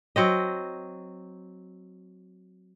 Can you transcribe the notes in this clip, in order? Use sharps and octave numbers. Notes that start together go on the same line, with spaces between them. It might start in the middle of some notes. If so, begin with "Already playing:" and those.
F#3 C4 D#5